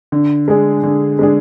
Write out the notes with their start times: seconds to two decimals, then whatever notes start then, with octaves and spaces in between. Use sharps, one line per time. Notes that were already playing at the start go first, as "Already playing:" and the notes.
0.12 D3
0.48 G#3 D4 G#4
0.83 D3
1.19 G#3 D4 G#4